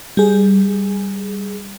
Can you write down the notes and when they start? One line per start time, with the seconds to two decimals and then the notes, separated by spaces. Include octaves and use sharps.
0.17 G3 G#4